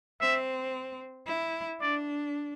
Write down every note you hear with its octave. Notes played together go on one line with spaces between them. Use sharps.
C4 E5
E4
D4 D5